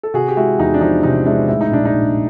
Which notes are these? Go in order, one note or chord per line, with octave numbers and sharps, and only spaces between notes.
A4
C3 F#4 G#4
G4
G#3 E4 F#4
E2 D#4
D4
F3 D#4
C3 D#4
G#3 D4 E4
A2 E4
D#4
A#1 D4
D#4
A#1